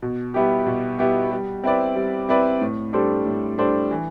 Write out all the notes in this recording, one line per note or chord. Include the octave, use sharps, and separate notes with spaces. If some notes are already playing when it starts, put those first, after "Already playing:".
B2
G3 B3 E4 G4
B2
G3 B3 E4 G4
G3
C4 E4 B4 D5
G3
C4 E4 B4 D5
A2
G3 D4 A4 C5
A2
G3 D4 A4 C5
E3